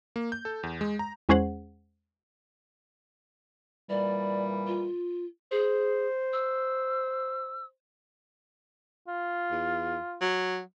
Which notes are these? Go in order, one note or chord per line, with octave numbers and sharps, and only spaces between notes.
A#3
G6
A4
E2
G#3
A#5
E2 G#3 C#4 G#4 C5 F#5
A#2 E3 G3 D5
F4
G#4 C5
E6
F4
E2
F#3